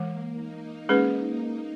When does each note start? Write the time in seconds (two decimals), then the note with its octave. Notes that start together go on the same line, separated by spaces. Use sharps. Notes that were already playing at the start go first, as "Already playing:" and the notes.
Already playing: E3 G#3 A#3
0.31 D#4
0.89 G#3 C#4 G#4 B4